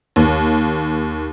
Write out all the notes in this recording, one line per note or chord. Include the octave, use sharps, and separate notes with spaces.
D#2